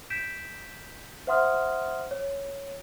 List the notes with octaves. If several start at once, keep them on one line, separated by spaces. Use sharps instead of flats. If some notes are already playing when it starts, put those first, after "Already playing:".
G6 B6 D7 E7
C5 E5 F#5 C6 D#6 F6
C#5